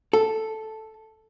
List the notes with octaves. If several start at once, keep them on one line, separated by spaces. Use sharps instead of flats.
A4